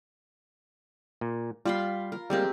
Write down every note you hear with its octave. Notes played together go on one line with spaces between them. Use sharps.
A#2
G3 F4 B5 C6
A#4
G3 G#3 A#3 C4 G4